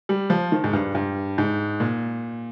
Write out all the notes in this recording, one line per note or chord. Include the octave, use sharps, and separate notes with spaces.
G3
F3
D#3
G#2
G2
G2
G#2
A#2